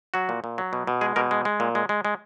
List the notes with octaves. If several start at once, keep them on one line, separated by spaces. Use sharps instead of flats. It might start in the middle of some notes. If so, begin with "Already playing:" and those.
F#3 F#4
A#2
A#2
F#3
B2
B2
G#3 G#4
B2 A#4
G#3
G#3
A#2
G#3
G#3
G#3